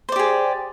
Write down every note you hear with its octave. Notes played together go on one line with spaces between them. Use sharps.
G4 G#4 C5 D5